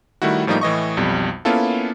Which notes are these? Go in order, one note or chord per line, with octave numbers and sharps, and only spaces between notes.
D#3 G3 A3 E4 F#4
A2 F3 G3 A#3 D#4
A2 E3 D#5 C#6
B1 F2 G3
A#3 B3 C#4 E4 F4 A4